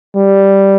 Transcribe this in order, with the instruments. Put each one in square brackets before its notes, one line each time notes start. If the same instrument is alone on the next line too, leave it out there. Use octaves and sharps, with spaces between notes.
[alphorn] G3